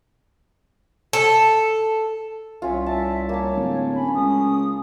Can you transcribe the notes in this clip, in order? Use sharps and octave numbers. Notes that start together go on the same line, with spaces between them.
A4
C2 C#4 F4 E5
E5 A5
A#3 C#5 A5
D1
C#4 B5
C#2 D#6